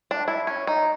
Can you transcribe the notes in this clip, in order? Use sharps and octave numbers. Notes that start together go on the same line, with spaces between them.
D4
E4
C#4
D#4